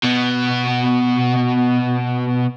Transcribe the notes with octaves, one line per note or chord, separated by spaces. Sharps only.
B2 B3